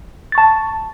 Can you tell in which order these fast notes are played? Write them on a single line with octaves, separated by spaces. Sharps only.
A6 C#6 A5